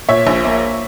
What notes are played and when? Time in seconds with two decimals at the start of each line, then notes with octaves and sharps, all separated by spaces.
0.09 A#2 C#5 E5
0.27 A#1
0.45 A#3